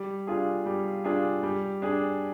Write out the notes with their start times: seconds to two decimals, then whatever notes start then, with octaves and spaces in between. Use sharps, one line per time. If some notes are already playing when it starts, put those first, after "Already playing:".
Already playing: G3
0.27 D4 F4 G#4
0.66 G3
1.04 D4 F4 G#4
1.43 G3
1.82 D4 G#4